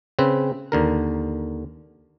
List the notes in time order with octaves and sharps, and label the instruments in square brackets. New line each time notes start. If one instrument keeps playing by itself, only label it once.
[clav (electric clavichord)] C#3 C4 B4
D#2 D3 A#4